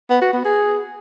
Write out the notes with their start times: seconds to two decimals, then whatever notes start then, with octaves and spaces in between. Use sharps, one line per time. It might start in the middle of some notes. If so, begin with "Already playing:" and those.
0.10 B3
0.22 F#4
0.33 B3
0.45 G#4